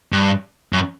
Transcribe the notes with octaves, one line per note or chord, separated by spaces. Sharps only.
G2
F#2